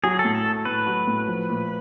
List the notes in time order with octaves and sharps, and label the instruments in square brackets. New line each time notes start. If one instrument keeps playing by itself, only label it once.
[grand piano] F#3 [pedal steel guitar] G#4
[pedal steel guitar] A4
[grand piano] A2
[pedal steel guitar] A4
[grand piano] A3
[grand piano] A2 [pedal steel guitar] B4
[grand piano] F#3
A2
F3
A#2